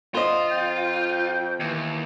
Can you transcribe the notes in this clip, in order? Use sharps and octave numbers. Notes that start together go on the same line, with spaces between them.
D3 F4 C5 D#5
F2 G5
D#2 E3